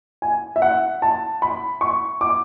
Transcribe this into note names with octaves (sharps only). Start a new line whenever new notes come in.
G#5
E5
F#5
A5
B5
C#6
D6